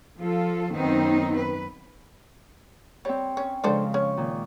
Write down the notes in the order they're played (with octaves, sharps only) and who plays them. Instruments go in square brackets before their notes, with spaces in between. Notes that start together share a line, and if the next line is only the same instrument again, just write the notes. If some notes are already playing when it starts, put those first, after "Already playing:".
[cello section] F3 F4 A4
F#2 D#3 B3 C4 D#4
B4
[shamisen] G3 [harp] C4 C#5
[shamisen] C#4
[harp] C#3 F3 G#3 [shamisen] D4 A4 C5
[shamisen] C#4 [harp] C#6
[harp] A#2 D#3